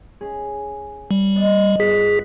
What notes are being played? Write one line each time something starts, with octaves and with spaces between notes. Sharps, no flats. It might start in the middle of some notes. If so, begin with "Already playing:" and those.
C#4 G#4
G3
B3 D4 D#5
G1 F#4 G#4 B6